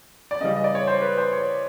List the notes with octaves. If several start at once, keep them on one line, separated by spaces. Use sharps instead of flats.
D5
C#3 E3 G3 D#5
D#5
D5
C#5
C5
B4
C5
C#5